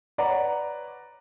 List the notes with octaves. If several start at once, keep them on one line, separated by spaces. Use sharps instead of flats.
B4 C#5 D5 F#5 A#5